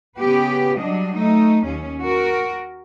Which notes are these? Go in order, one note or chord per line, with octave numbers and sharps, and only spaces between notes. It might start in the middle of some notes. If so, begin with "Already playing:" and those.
C#3 B3 G4 B4
F#3 G3 D4 D#5
A3 D#4
D#2 C#4
F#4 A#4